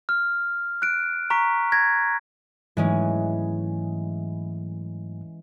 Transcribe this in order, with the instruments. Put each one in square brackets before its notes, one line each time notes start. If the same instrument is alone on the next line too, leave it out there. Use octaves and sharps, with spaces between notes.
[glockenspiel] F6
F#6 D7
A#5 C#6 B6 D7
G#6 A#6 D7
[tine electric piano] G#2 F#3 A3 [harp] E3 G#3 C#4